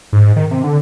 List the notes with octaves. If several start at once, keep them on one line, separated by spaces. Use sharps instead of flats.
G#2
D#3
C3
D3